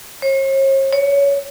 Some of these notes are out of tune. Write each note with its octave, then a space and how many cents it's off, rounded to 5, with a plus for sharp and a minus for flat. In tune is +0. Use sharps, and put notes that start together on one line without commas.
C#5 -45
C#5 +20